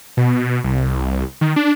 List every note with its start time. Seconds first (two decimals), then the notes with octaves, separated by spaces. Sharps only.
0.17 B2
0.64 C2
1.41 D#3
1.56 D4